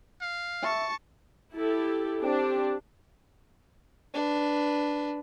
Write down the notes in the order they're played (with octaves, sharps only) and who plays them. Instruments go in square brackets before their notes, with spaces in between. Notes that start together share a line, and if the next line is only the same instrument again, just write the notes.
[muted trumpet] F5
[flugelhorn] E5 [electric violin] A5 C#6
[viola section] E4 G4 A4
[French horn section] C4 G4 [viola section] D4
[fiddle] D4 B4